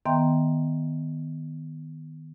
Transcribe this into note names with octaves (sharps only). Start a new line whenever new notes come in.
D#3 B3 E5 G5 A#5 C6